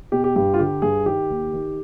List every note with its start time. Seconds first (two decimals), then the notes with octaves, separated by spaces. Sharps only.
0.12 B2 G4
0.24 G4
0.36 G2 G4
0.54 F4
0.59 D3 G4
0.82 G2 G#4
1.06 D#3 G4
1.30 D#2
1.54 D#3